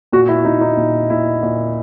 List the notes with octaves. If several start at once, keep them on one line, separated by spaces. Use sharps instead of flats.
A#2 F#4
E4
A#2 D#4
D#4
A#2
A#2 E4
A#2